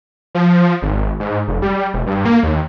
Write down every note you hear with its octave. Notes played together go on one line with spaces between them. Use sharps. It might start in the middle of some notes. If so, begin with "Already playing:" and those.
F3
G#1
G#2
F1
G3
E1
G2
A#3
D#2